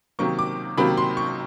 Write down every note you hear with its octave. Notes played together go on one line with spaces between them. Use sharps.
C3 D#3 F#3 A#3 C#6
D6
C3 D#3 F#3 A#3 B5
C6
C#6